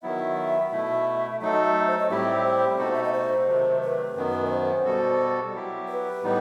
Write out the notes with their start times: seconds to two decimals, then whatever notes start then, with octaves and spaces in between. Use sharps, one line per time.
0.03 D#3 F#3 B3 E4 E5
0.72 B2 A3 E4
1.40 F#3 A3 D#4 A4 E5
1.52 D#5
1.63 E5
1.87 C5
1.98 D#5
2.09 A2 G3 C4 E4 G4 E5
2.44 C5
2.78 B2 A3 D#4 F#4 A4
2.93 E5
3.03 D#5
3.13 C5
3.47 C3 D#3 F#3 A3
3.82 B4
4.15 F#2 D#3 F#3 B3
4.45 D#5
4.50 C5
4.85 B2 G3 B3 F#4 A4
5.53 F#3 B3 E4 G4
5.88 B4
6.23 A2 E3 G3 B3 D#4